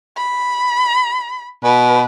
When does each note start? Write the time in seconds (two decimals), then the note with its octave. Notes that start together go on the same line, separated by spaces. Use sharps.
0.17 B5
1.64 B2 B4